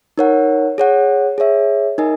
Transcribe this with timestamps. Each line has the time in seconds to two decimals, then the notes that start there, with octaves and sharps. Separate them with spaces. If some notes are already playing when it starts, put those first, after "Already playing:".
0.18 D#4 A#4 C#5 F#5
0.78 G#4 C#5 F#5
1.38 G#4 C#5 E5
1.98 D#4 A#4 D#5 G#5